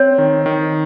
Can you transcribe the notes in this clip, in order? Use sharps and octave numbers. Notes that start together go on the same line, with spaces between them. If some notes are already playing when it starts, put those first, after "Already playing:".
Already playing: C4 C#5
D#3
D#3